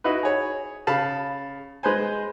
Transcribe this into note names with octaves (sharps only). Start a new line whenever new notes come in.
D#4 E4 F#4 B4
G#4 C#5
C#3 F5 A5 B5
G#3 B4 C5 G#5